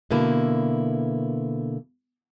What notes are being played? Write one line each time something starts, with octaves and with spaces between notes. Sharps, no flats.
B2 D3 A#3 E4